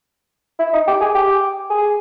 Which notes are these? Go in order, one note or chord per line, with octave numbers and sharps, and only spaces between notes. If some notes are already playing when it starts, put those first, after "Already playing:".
E4
D#4
G4
G#4
G4
G#4